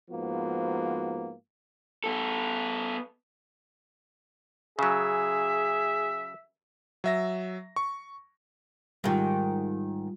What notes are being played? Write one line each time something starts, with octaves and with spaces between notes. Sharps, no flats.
G#2 F3 A#3 B3 F#4
B3 A4
C#3 F#3 G#4 E5
F#3 E5 A#6
C#6
G#2 D#3 G3 F4